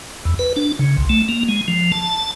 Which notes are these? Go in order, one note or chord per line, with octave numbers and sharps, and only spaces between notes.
E2
B4
D4
C#3
C2
A3
A#3
G#3
F3
A5